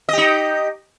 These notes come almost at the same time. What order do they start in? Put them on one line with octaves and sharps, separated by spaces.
D#5 G4 D#4